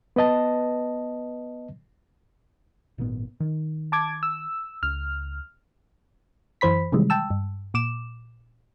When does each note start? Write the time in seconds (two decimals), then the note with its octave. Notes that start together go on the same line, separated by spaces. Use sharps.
0.16 B3 B4 D#5 A5
2.98 G#1 A#2 B3
3.40 D#3
3.92 A5 D6 G#6
4.23 E6
4.83 C#2 F6
6.61 F#2 E3 C5 B5 B6
6.92 C3 D#3 E3 G3 G#3
7.10 G5 A5 E6
7.30 G2
7.74 A#2 D6 E7